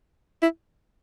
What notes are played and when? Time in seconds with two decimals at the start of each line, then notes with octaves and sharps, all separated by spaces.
0.42 E4